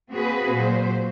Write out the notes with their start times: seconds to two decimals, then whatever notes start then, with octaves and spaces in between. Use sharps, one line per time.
0.12 A#3 C4 F#4 G#4 B4
0.54 A#2 F#3 C5